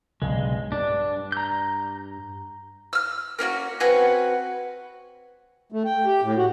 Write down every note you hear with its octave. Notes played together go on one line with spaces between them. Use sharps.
B1 G2 C#3 G#3
G2 D4
A#5 G6
E6 F6
A#3 C#4 D#4 F#4
C4 F#4 B4 G#5
A3
G5
G4
A2
F#4